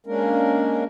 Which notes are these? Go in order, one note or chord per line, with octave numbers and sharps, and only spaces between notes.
G#3 A#3 C#4 D4 A#4